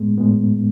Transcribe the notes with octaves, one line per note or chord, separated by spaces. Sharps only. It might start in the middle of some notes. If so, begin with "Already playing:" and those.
Already playing: A2 G#3 B3
A2 G#3 B3